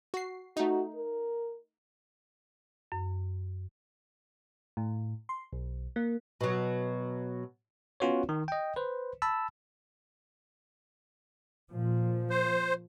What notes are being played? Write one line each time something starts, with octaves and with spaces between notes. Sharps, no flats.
F#4 C7
A3 D#4 F#4
A#4
F#2
A2
C6
B1
A#3
B2 F#3
B3 C#4 F4 F#4 B4 C#5
D#3
D#5 G5
B4 C5
A5 B5 E6
A#2 F3
C5